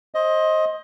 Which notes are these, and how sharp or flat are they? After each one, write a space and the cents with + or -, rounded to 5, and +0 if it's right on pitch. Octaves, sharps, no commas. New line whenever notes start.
C5 +25 D#5 +15